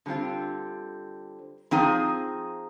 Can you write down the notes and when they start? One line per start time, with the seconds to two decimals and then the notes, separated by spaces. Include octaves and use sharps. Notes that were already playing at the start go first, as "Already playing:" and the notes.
0.06 D3 G3 C4 F4
1.71 F3 C4 D#4 G#4